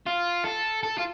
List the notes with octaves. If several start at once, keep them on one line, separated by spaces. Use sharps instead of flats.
F4
A4
A4
F4